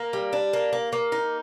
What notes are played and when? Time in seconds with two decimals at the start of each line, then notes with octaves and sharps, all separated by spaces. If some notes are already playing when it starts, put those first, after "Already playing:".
Already playing: A#3
0.13 G3
0.33 D4
0.53 A#3
0.73 A#3
0.93 A#3
1.12 D#4